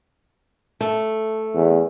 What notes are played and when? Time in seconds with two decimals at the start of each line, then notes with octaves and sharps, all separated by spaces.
0.81 A3
1.54 E2